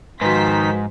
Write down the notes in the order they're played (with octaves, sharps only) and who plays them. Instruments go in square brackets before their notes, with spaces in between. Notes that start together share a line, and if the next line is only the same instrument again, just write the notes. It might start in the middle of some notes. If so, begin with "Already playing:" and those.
[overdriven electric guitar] G#2 [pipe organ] D#3 D#4 [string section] F3 C5 B6 [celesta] F#4 B4